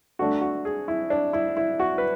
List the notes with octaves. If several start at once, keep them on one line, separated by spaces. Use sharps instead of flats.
D3 A3 D4 F#4
F#4
G#4
E4
D4
E4
E4
F#4
B4